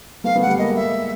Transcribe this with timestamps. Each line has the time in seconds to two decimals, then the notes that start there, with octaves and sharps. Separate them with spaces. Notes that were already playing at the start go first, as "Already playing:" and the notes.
0.24 A3 B3 F5
0.35 A3 B3
0.42 F#5
0.47 G3 A3
0.59 G#3 A#3 D#5
0.75 E5